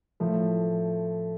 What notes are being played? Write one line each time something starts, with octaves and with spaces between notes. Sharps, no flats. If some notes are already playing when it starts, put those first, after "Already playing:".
A2 F3 A3